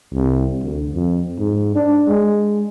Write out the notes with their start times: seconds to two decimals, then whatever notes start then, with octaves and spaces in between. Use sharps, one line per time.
0.14 C2
0.63 D2
0.94 F2
1.39 G#2
1.75 D4
2.08 G#3